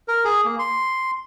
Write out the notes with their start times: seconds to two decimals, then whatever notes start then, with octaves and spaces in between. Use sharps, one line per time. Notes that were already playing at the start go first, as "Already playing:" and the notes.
0.08 A#4
0.25 G#4
0.45 A#3
0.59 C6